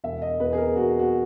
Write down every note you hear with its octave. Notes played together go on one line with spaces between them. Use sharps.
E1 E5
D#5
E2 B4
G#4
A#4
E1 F#4
F#4